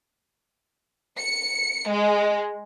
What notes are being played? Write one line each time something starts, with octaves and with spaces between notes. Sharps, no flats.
C#7
G#3